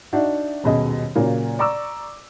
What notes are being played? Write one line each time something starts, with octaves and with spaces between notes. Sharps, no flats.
D4 D#4 F#4 E5
D#1 F#2 B2 G#4 D#5
A#2 C#3 F#3 A#3
D5 A#5 C#6 D6 E6